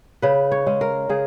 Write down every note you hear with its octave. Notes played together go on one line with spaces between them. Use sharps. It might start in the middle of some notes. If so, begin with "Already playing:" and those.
C#3 B4
C#5
G#3 C#4
A#4
C#3 G#4